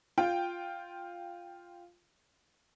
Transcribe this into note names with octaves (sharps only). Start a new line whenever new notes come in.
F4 G5